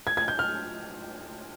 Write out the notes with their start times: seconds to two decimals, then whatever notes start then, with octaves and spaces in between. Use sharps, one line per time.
0.07 G#6
0.17 G#6
0.28 G6
0.39 F6